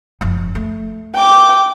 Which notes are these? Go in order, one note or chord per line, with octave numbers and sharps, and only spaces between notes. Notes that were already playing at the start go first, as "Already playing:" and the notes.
F#1 F3
A3
G5 D6